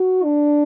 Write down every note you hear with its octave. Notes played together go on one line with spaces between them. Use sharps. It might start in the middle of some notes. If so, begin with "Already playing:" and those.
Already playing: F#4
D4